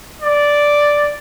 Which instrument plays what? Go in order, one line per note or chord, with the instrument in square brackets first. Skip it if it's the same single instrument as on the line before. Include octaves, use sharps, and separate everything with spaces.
[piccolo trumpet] D5